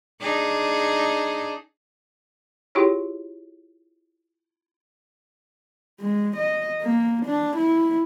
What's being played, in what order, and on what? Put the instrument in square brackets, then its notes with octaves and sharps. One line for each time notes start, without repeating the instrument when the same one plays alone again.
[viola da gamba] D4 D#4 G#4
[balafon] E4 F4 G4 G#4 C#5
[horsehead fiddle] G#3
D#5
A#3
D4
E4